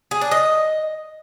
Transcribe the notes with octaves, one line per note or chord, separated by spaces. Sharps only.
G#4
D4
D#5